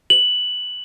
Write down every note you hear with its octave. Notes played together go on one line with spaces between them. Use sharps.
F#7